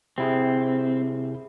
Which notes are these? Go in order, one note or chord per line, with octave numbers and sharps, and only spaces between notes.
C3 C4 E4 G#4